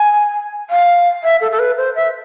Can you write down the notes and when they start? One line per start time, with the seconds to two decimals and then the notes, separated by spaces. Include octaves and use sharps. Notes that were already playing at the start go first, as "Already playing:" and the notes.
Already playing: G#5
0.70 F5
1.24 E5
1.41 A4
1.52 A4
1.59 B4
1.77 C5
1.96 E5